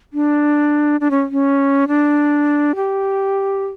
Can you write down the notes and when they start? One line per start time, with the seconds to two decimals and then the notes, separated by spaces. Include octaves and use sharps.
0.13 D4
1.00 D4
1.11 C#4
1.31 C#4
1.88 D4
2.75 G4